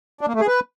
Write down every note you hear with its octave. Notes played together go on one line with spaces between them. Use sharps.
D4
A#3
A3
G#4
B4